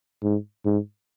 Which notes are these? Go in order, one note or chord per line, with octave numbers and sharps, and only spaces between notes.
G#2
G#2